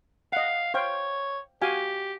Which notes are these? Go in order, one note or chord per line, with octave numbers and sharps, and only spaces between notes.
D#5 F5 F#5
C5 C#5 F5 G5
F#4 G4 F5 G#5